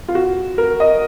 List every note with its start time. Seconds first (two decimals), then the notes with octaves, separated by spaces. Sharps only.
0.08 F4
0.15 F#4
0.58 A#4
0.80 D#5